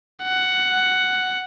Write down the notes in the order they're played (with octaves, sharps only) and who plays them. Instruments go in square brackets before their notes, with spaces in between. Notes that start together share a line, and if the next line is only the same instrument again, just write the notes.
[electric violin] F#5